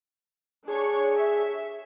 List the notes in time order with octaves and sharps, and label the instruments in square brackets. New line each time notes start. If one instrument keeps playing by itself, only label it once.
[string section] D4 C#5 C#6 [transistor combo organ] G#4
[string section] E5